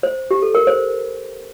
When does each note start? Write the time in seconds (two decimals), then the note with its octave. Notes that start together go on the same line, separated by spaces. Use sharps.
0.03 C5
0.31 G4
0.42 A4
0.55 A#4
0.67 C5